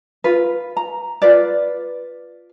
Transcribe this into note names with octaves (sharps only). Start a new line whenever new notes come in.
F4 B4
A#5
F4 B4 D5